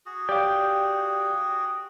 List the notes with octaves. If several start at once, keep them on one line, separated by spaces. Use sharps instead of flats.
F#4 G#4
G4 D5 F5 G5 D6